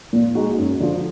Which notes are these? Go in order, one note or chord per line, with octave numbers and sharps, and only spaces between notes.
A#2
G#3 D#4 F#4
F#2
D3 F3